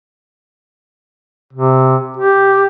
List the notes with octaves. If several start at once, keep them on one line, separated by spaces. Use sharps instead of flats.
C3
G4